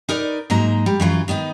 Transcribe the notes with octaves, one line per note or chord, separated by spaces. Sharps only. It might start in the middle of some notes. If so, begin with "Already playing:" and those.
D#4 A#4 B4 D5
G#2 F#3 G#3 A#3 D#4 A#5
G3
F#2 E3 F#3 F4
D#3 B3 C#4 D#4